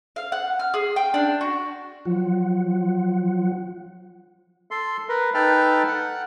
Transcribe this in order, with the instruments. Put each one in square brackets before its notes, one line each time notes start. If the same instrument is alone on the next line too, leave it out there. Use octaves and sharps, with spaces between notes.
[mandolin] F5
F#5
F6
G#4
G5
D4
F#4
[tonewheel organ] F3 F#3 F4 F#5
[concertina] A4 C6
A#4 B4
D#4 A4 B4 G5 A5 F6
F#5